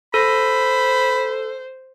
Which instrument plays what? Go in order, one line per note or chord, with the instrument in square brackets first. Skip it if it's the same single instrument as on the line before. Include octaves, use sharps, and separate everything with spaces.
[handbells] A4 [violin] C5 [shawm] B5